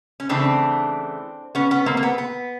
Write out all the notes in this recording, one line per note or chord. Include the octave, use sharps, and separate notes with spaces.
C#4
C#3 E3 A3 C4 D4
B3 C#4
B3 C#4
A#3 C4
A#3
B3
B3